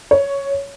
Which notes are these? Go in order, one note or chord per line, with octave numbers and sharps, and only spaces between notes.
C#5